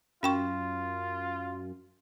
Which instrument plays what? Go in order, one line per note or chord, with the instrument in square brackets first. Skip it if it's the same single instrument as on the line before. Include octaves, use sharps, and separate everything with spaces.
[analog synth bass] F#2 [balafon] C#4 G5 C#6 [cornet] F4